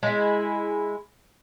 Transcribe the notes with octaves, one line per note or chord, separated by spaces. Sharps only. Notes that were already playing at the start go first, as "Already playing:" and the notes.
G#3 E4